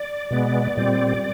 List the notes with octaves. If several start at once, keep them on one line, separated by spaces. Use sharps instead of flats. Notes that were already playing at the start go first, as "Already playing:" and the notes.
Already playing: D5
B2 G#3 B3
A#2 G3 C4